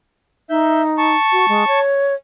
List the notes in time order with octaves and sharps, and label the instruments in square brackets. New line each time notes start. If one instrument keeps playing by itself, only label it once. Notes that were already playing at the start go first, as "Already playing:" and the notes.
[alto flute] D#4 [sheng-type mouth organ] E5 G6
[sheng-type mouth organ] A5 C#6
[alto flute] F#4
G#3
C#5